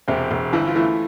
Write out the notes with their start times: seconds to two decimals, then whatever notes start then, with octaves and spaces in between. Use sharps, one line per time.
0.08 E1 C3 C4
0.31 E1
0.53 G1 E3 E4
0.67 F4
0.76 E3 A3 E4